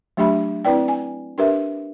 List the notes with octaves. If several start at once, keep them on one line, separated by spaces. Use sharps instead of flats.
F#3 A3 D4 G4 E5 B5
C4 E4 B4 D5 G5
G#5
D4 G4 A#4 B4 E5